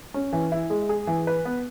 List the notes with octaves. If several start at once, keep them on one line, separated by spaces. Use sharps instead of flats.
C#4
E3
E4
G#3
G#4
E3
B4
B3